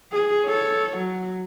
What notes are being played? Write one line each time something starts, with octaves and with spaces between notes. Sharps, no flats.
G#4
A4 C#5
F#3